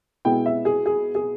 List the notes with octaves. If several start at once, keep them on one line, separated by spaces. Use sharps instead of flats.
B2 G#3 B3 E4 G5
E5
G#4
G#4
G#4